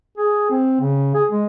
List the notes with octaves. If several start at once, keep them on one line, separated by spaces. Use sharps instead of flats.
G#4
C4
C#3
G#4
G#3